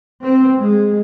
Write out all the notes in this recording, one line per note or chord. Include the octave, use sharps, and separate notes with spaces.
C4
G#3